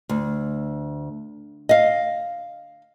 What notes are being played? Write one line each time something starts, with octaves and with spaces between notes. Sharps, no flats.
D2
D#5 F5